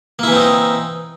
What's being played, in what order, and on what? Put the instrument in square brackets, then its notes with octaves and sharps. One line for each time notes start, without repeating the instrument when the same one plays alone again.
[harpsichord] A#3
E4
E3
C4
D#4